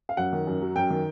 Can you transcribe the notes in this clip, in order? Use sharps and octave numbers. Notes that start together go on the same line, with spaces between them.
F5
F#2 F#5
D#3
F#2
F#3
F#2 G5
D#3